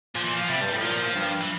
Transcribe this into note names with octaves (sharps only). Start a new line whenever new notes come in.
A#2 F3
E3
F3
C3 G3
G2
A2
A#2 F3
G2
E3